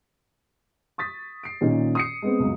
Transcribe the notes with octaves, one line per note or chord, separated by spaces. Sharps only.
C#6 D#6 A6 B6
C7 D7
A#2 D#3 C#4 D#4
D#6 C7 C#7
G#3 B3 C4
C#2 F#2